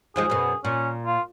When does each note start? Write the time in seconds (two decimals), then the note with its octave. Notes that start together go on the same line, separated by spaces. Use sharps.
0.16 D#2 F3 G#3 G#4
0.30 F#2 B2
0.65 A#2 C#4
1.06 F4